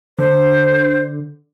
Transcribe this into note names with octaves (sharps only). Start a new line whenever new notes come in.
D3 C5